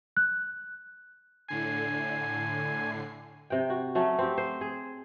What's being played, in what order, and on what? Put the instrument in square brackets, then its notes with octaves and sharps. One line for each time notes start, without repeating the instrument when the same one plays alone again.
[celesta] F#6
[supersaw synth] A2 D3 C7 [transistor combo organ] G#5
[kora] C3 G5
F#4
F#3 A3 C#4 A4
C4 G4
C5
G#4